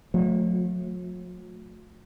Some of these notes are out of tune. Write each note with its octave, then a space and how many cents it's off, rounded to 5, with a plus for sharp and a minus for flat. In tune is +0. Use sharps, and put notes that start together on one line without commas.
F#3 -45 A3 -5